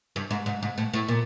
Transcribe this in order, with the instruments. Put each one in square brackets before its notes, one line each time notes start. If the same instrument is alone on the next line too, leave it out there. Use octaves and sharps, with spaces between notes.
[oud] G2
G#2
G#2
G#2
A2
A2
A#2